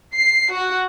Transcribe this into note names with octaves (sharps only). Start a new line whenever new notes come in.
C7
F#4